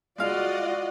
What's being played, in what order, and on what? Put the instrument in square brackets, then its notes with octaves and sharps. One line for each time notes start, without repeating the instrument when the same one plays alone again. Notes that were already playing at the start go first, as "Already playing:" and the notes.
[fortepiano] G#3 F5 [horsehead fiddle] F4 F#4 [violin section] D5 D#5